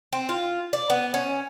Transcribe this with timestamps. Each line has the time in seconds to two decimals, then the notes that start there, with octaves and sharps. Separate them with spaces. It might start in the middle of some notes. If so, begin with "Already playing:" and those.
0.13 C4
0.29 F4
0.73 D5
0.90 B3
1.14 C#4